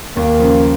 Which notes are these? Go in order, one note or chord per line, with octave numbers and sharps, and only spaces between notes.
D#2 A#3
C#3 F3